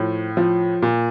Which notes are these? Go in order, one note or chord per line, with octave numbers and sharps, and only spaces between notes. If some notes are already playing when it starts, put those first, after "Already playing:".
Already playing: A2 F3
F3
A#2